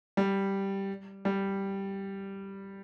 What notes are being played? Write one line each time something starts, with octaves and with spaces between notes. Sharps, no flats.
G3
G3